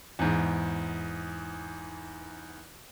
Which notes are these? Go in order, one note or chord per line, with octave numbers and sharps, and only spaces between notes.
E2 G#2